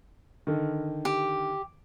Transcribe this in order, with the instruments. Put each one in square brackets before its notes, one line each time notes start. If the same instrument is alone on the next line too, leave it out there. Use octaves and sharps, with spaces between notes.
[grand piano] D3 D#3
[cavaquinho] G4